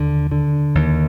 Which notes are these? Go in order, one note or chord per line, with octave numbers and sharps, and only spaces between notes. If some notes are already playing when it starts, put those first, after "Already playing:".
Already playing: D#2 D3
D3
D#2